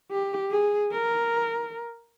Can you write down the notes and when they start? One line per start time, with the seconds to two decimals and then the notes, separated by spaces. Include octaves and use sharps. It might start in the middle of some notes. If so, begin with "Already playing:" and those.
0.11 G4
0.51 G#4
0.92 A#4